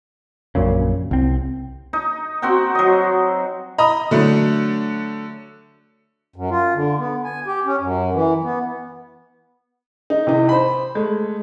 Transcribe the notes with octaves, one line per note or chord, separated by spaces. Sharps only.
A#1 F#2 A#2 C#3
C2 C4
D#4
C4 F#4 G5
F#3 D#5
D#5 A#5 B5 D#6
D3 F#3 A3 D4
F#2
F4
D3
B3
G#5
G4
C#4
F#2
E3
B3
D#4
C3 E3 D#4
C5 B5
G#3 A3